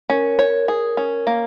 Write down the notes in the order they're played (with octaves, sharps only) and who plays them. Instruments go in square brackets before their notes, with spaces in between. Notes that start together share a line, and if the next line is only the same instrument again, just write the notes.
[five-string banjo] C#4 [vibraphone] A#4
[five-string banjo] C#5
G#4
C#4
A#3